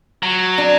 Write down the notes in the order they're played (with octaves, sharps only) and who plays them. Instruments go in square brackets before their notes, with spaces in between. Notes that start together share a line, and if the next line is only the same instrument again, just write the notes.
[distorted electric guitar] F#3
[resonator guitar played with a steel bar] D4